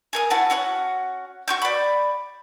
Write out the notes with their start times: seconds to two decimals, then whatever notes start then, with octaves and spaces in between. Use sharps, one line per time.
0.13 G#4 A#4 D#6
0.30 E4 F#4 F#5 A5
0.50 C#4 F#4 F#5
1.48 F#4 C#6 G6
1.62 D5 B5